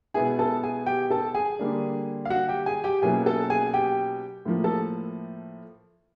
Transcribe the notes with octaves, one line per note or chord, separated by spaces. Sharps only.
B2 G#3 B3 E4 G#4 G#5
A4 A5
G#4 G#5
G4 G5
A4 A5
G#4 G#5
D3 G3 A#3 D4
F5
F#4 F#5
G4 G5
G#4 G#5
G4 G5
B2 F#3 A#3 C#4 E4 G#4 G#5
A4 A5
G#4 G#5
G4 G5
A2 F3 A#3
A4 A5